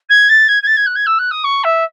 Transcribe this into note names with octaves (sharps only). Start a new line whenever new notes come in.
G#6
A6
G#6
G#6
A6
G#6
F#6
G#6
E6
F#6
D#6
C#6
E5